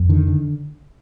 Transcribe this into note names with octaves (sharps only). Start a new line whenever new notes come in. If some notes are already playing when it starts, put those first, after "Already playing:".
Already playing: F2
D3 D#3
D3